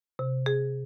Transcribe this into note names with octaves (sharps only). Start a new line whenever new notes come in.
C3
G#4